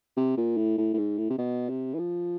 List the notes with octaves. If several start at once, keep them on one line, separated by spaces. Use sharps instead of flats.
C3
A#2
A2
A2
A2
G#2
A2
C3
B2
C3
E3
F3